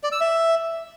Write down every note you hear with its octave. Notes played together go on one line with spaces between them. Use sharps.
D5
E6
E5